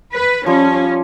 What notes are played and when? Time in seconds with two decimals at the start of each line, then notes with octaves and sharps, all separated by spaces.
0.14 B4
0.46 F3 G3 C#4 C5